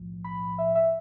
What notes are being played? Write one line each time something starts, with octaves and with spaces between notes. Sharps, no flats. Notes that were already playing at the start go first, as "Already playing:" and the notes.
Already playing: B1 A2 F3
B5
E5
E5